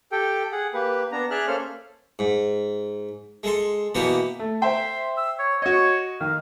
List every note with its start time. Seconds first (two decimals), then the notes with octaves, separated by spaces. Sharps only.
0.12 G4 A4 G5
0.52 G#4 F#5
0.74 A#3 G4 B4
1.12 B3 D4 A#5
1.31 G#4 D5 E5 F6 F#6
1.47 A#3 C#4 A4 C5 F6
2.19 G#2
3.43 G#3 A4 C6
3.95 B2 E3 A#3 B3 G4
4.39 A3
4.62 C5 E5 G5 C6
5.17 E6
5.39 C#5
5.62 F#4 C#5 D#5
6.21 D#3 F5